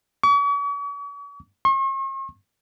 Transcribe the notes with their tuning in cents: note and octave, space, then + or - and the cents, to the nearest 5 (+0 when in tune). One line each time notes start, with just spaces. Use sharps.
C#6 +45
C#6 -45